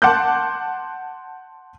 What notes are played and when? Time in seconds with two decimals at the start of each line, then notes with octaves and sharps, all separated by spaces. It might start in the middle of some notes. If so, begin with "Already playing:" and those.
0.02 F#5 A5 C6 D6 F#6 G6